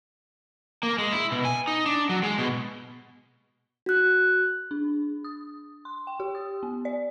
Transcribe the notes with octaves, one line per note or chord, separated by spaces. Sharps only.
A#3
G#3
E4
B2
G#5
D#4
D4
F#3
G#3
B2
F#4 F#6
D4
D#6
C6
G5
G4
D#6
B3
D5